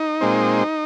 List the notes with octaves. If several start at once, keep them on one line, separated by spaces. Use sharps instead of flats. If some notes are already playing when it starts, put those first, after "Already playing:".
Already playing: D#4
A#2 G#3 C4